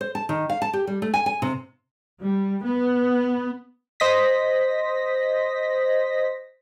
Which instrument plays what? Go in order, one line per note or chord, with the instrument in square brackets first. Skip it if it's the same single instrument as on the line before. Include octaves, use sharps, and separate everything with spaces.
[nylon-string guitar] C5
A5
D#3
F5
A5
G4
G3
A3
G#5
G#5
C3
[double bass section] G3
B3
[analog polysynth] C5 D#5 A#6 B6